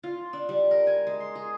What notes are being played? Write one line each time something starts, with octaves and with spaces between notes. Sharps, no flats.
F4
D4
G3
A#4
G#5
G#3
C6
G#4